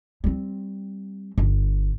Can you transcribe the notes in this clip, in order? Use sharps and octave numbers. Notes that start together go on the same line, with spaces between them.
G3 C4
G1